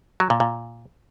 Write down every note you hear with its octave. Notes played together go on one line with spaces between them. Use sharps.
F#3
A#2
A#2